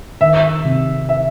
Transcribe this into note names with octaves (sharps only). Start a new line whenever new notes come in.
D#3 E5
C3
E5